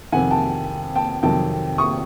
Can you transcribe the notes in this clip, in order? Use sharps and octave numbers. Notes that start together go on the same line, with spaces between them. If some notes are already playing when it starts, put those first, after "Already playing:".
F2 C3 D#3 F#5 G#5
G5 A5
G5 A5
F2 C3 D#3 F#3 G5 A5
C#6 D#6